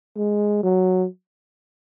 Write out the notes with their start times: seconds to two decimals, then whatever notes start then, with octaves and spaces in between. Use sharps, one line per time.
0.16 G#3
0.63 F#3